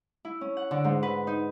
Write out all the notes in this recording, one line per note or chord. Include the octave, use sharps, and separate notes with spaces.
E4
C#4
F#5
D3
G#2
B4
D#4